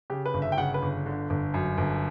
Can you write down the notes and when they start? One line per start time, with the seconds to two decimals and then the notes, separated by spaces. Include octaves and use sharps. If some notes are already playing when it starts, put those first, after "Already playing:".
0.10 C#3 G4
0.25 B4
0.34 G1
0.42 E5
0.52 G5
0.58 C#3 F#5
0.74 B4
0.82 G1
1.06 D3
1.30 G1
1.54 F#2
1.78 G1